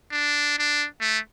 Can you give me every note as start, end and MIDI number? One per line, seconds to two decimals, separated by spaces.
0.12 0.55 62
0.59 0.87 62
1.01 1.19 57